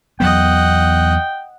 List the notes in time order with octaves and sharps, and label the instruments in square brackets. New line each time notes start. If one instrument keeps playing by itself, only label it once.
[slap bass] E2 F#3 B3 [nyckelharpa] D#5 F#5 [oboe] G5